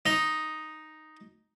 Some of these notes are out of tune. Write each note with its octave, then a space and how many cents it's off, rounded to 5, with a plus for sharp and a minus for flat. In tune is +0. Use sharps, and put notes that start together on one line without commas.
D#4 +0 D#5 +0